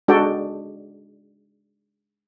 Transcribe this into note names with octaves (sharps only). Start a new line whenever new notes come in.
G#3 D4 F#4 A4 D5 G5